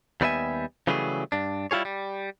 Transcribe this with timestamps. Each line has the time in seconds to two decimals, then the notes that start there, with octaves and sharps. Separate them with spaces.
0.21 D#2 G3 B3 D#5 E5 G#5
0.87 C#3 E3 F#3 G3 A3 G#4
1.32 G2 D4
1.71 G3 E4 F4 G#4 C#5
1.85 G3